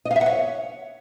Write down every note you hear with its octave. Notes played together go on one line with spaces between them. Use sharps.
D#5
F5
E5
F#5
C#5